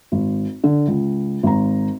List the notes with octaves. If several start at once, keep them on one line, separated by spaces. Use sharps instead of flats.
G#1
D3
C#2
G#1 A#5